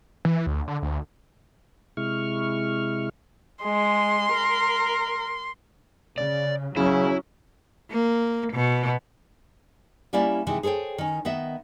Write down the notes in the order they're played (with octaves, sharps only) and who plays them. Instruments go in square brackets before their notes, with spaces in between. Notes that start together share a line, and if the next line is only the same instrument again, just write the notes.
[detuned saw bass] E3
D2
D3
D2
[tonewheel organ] C3 G#3 E4 C#6 F6
[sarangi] G#3 [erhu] C6
[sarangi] A#4
[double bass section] C#3 [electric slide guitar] D5
[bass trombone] C#3 [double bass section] F#3 C#4 [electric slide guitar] E4
[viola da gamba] A#3
B2
[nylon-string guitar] G3 A#3 C#4 E4 D5 E5
C3 D#3 E3 G#3
G#4 A4 C5 C#5 G5
D#3 C#4
D#3 B3 D#5 E5